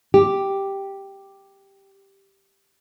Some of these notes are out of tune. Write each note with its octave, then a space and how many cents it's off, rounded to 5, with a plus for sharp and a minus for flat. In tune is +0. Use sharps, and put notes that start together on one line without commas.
G4 +0